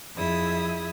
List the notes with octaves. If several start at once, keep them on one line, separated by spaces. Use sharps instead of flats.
F2 E4 G#4 E5 D#6